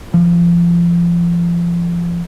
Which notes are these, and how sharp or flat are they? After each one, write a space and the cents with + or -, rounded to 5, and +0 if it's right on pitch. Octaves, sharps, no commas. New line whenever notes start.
F3 -25